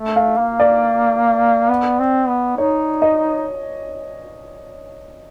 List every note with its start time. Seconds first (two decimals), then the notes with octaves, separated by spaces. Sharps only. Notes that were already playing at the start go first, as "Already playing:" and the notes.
Already playing: A3
0.16 F5
0.38 A#3
0.60 D5
1.70 B3
1.99 C4
2.28 B3
2.57 D#4 C#5
3.02 D#5